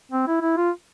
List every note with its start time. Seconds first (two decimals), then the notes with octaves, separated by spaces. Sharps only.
0.12 C4
0.27 E4
0.41 E4
0.57 F4